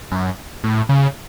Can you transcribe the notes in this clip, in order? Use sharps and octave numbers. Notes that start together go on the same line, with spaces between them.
F#2
A2
C#3